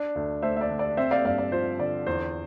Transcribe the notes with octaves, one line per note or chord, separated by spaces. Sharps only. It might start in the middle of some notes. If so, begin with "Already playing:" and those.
Already playing: D4
D2
A3 C5 E5
E5
D5
D3
D5
C4 C5 E5
D5 F5
G2 D5 F5
D5
F3 C5
D3 D5
E2 C5